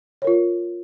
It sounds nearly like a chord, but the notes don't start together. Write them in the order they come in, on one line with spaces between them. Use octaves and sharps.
C#5 A#4 F4